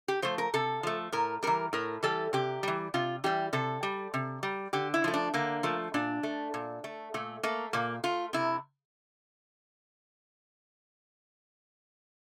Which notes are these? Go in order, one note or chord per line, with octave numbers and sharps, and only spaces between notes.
G4
F3 A3 C5
A#4
C3 A4
F3 A3
A2 A#4
E3 G3 A#4
A2 A#4
E3 G3 A4
C3 G4
E3 G3
C3 F4
E3 G3 G4
C3 A4
G3
C3
G3
D3 G4
E4
F3 A3
D4
D3 A#3
F3 A3
A#2 D4
A3
A#2
A3
A#2 A3
A3 A#3
A#2 A#3
A3 F4
C3 E4